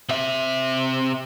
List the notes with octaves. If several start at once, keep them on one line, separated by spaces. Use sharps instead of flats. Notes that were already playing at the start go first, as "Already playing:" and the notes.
C3 E5